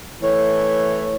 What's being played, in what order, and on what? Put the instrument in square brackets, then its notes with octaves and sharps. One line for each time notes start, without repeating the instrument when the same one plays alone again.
[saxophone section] E3 A3 C#5